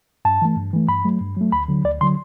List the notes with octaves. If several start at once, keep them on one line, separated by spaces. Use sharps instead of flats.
G2 A5
E3 A3
G2
E3 A3
G2 B5
F#3 A3
G2
F#3 A3
D2 B5
D3 F#3
D2 D5
D3 F#3 C6